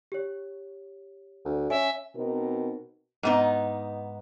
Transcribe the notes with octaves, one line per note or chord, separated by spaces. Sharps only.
G4 C#5
D2
C#4 E5 G#5
B2 C4 D#4 A#4
G#2 B3 D#4